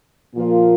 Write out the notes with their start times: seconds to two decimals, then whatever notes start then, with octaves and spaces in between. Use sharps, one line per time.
0.34 A#2 F3 A#3 F4 A#4